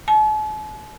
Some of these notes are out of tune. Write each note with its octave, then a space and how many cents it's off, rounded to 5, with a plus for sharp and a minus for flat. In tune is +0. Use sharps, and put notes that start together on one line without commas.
A5 -45